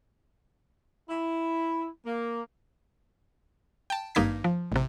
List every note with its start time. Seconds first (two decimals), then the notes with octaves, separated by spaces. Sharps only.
1.10 E4
2.06 A#3
3.90 G5 A5
4.15 G#1 G2 A#3 D#4 G#6 B6
4.44 F3
4.72 A1 C3